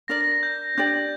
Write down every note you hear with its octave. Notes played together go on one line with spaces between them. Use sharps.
D4 A#4 D5 A#6
A#6
A#6
G6
D4 G4 D5 G5 G6